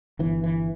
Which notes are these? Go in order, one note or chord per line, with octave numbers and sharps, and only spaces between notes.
G1 E3
E3